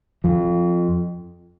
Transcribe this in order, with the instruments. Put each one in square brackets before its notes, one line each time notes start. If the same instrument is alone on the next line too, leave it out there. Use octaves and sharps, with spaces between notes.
[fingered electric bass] F2 F3